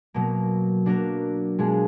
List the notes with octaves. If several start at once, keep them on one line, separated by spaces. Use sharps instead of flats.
B2 F#3 A#3
F#3 A#3 D4 F#4 A#4
B2 G#3 D4 F4 G#4